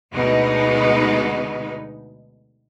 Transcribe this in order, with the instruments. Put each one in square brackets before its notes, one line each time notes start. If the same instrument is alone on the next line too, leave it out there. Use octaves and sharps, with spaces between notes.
[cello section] D2 B2 G#3 B3 D#4